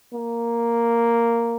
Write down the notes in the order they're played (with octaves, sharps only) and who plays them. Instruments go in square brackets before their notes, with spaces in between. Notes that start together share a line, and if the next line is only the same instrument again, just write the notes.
[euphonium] A#3